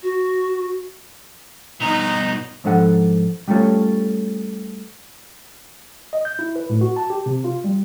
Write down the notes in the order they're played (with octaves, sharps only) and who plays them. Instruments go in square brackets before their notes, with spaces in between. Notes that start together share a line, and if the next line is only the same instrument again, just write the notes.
[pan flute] F#4
[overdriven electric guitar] G2 B2 [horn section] D#4
[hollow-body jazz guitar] G#2 F3 D4 A4 F#5
G3 A3 C#4 F4 A4 C#5
[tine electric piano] D#5
G6
E4
B4
A2
F#4
A5
G4
C3
F4
G3